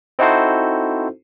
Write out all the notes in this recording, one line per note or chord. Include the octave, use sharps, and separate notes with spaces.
C4 D#4 E4 F#4 A4 C5